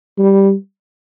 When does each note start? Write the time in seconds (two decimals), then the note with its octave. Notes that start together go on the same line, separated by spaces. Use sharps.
0.18 G3